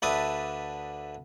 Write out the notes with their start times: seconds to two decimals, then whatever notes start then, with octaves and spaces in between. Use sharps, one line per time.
0.02 D2 D4 B4 E5 A5 D#6